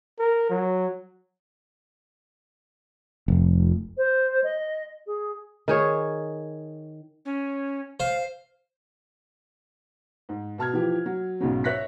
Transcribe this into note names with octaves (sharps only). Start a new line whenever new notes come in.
A#4
F#3
F1
C5
D#5
G#4
D#3 G#4 C#5
C#4
C5 F5
G#2
B2 A5 F6 G#6
E3 F3 G4
F#3
B1 G#2 C#3 F#3
C#5 E5 F#6 A#6 B6